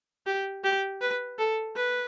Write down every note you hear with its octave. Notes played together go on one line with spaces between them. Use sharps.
G4
G4
B4
A4
B4